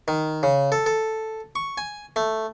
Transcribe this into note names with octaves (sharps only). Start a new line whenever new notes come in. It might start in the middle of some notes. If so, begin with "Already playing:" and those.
D#3
C#3
A4
A4
C#6
G#5
A3